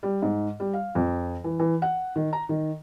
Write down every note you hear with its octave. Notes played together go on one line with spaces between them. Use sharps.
G3
G#2
G3
F5
F2
E3
E3
F#5
D#3
A#5
D#3